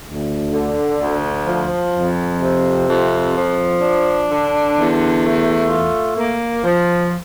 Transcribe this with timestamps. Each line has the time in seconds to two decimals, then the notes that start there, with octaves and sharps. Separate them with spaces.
0.06 D2
0.53 D3
1.00 D2
1.46 F3
1.94 F2
2.41 C3
2.88 F2
3.35 F3
3.82 D4
4.29 D3
4.76 E2
5.23 A3
5.70 F4
6.17 A#3
6.64 F3